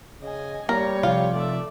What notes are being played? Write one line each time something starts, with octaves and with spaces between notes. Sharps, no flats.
C#3 D#5 G#5
G3 A#3 A#4 C#5
C3 F3 F4
A3 D5 E5